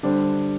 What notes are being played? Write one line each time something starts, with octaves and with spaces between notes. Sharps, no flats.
D3 G3 D4 C5